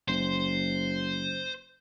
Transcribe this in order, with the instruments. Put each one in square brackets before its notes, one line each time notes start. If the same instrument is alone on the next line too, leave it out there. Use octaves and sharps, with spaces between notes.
[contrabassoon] F#1 [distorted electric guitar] C5